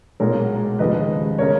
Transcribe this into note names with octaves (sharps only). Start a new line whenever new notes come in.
B1 A#2 G#3 A#4 C#5
F1 D#2 C#3 F3 G#3 B4 D#5
C#3 G#3 A#4 C#5